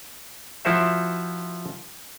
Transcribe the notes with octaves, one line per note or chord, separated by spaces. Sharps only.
F3 E4 F#4 C5 E5